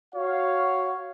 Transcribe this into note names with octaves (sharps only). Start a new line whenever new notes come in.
F#4 C#5 F5